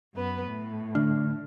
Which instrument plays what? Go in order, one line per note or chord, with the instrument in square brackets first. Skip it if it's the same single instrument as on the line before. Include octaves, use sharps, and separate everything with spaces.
[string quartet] F#2 B3 B4
A2
[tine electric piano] D3 A3 F6 [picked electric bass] D4